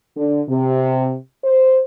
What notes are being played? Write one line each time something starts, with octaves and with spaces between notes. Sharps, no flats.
D3
C3
C5